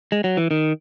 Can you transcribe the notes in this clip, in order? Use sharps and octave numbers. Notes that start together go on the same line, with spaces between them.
G#3
F#3
E3
D#3